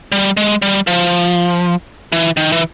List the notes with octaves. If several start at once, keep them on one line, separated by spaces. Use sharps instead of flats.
G3
G#3
G3
F3
E3
D#3
E3